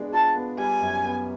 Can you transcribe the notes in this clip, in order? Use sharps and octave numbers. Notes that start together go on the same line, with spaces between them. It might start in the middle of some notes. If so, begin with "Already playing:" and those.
Already playing: G#3 B3 D4
F4 A5
B3
G3 G#5
F#2
B3